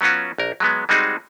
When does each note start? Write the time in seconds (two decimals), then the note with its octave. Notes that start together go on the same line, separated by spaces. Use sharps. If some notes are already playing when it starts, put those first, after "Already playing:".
0.01 F#3 B3 C#4 F4 F#4
0.38 A#1 A#4
0.60 F#3 G#3 B3
0.89 G3 G#3 C4 D#4 F#4 G#4